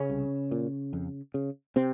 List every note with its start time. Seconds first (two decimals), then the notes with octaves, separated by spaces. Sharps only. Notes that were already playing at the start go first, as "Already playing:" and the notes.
Already playing: C#3 C#4
0.10 C2
0.51 A#2
0.93 F2
1.34 C#3
1.76 C3 C4